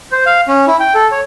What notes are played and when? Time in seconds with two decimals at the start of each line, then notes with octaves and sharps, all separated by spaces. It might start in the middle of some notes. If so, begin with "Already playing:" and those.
0.12 C5
0.26 F5
0.48 C#4
0.67 E4
0.80 G5
0.95 A4
1.12 C#5